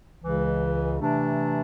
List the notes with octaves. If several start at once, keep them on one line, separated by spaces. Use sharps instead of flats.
C#2 C#3 E3
C3 E3 A3 D4